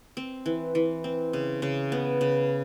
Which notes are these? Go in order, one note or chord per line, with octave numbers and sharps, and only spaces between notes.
C4
E3
E3
C4
C#3
C#3
B3
C#3